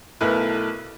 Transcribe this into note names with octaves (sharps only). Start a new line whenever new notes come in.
B1 A3 E4 A#4 B4